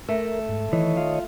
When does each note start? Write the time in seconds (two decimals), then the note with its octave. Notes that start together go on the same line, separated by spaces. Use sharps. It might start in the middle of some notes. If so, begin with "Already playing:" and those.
0.09 A3 A#4
0.49 G#2
0.73 D#3 E3 C#5 D#5
0.97 F4